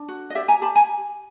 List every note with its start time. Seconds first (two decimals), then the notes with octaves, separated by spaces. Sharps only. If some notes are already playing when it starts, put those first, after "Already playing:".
Already playing: D4
0.08 F#4
0.30 D#5
0.35 G4 D5 E5
0.48 G#5 A#5
0.62 G4 A5 B5
0.75 G#5 A#5